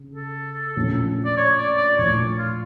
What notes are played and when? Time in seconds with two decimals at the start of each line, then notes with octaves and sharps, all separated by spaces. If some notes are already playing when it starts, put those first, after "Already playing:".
Already playing: C#3
0.15 A4
0.76 A#1 A2 F3 C#4 F4
1.25 D5
1.37 C#5
1.57 D5
1.78 D5
1.98 A#1 A2 F3 C#5
2.39 F4